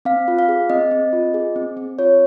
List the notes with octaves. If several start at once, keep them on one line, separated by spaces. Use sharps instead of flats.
C4 F5
F4
F5
G#4
C4 D#5
C4
F4
G#4
C4
C4
F4 C#5